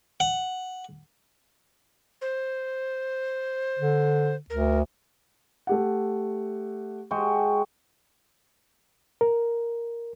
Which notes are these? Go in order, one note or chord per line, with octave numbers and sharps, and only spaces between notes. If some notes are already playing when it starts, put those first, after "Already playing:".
F#5
C5
D3
D2 A#4
A3 G4 F#5
G#3 F#4 G5
A#4